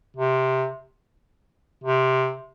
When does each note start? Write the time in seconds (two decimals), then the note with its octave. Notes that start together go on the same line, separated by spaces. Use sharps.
0.16 C3
1.83 C3